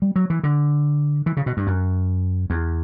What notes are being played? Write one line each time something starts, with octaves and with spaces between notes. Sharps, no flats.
G3
F#3
E3
D3
E3
C#3
B2
G2
F#2
E2